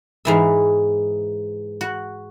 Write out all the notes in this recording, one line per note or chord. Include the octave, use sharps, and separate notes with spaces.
G#2 E3 E5
F#4